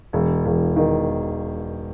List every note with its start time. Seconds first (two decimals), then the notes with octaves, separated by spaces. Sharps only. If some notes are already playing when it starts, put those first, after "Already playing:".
0.13 E1
0.45 E1
0.76 D#3